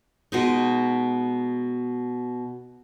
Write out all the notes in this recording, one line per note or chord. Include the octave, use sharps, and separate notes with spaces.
B2 G#3 D#4